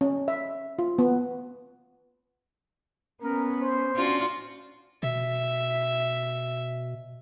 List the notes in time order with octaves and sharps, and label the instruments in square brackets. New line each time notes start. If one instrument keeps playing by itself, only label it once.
[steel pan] C#4
E5
F4
B3
[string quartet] B3 [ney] C#4 [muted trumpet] A#4
[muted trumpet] C5
[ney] C#4 [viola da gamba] D4 F4 F#4 [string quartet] C6
[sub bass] B2 [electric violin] E5